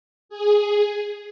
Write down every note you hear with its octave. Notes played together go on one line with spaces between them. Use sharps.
G#4